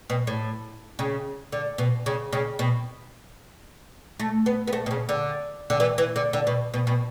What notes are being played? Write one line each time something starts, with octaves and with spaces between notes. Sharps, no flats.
B2
A2
C#3
D3
B2
C#3
C#3
B2
A3
B3
B3
A3
B2
C#3
D3
D3
E3
E3
D3
D3
B2
B2
B2